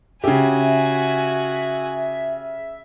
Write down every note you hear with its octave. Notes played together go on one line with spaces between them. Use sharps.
C#3 F#4 G4 E5 G#5